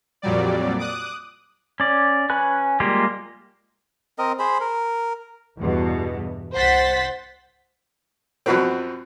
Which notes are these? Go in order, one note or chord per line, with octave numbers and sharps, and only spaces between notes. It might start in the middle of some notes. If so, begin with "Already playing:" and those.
F2 A#2 F#3 G3 D5
D6 D#6 F#6
C#4 D5
C#4 B4 G#5 F#6
G3 G#3 A#3 F4 G4
C4 A#4 D#5
G#4 C5 B5
A#4
E2 G2 B2
C2 C5 F#5 A6 B6
F#2 B2 F3 F#3 B3 C4